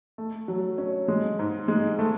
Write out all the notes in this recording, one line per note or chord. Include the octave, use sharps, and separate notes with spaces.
A3
F#3
C#4
G#3
G#2
G#3
A3